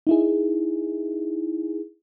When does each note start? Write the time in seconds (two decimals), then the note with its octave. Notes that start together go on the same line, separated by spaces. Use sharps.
0.07 D#4 E4 G#4